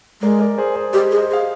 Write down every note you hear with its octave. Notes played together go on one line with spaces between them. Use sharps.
G#3 A#4 D5
A#4 D5
G#4 C5
G#4 C5
G4 C5 D#5
G#4
C5 D#5
G#4
F5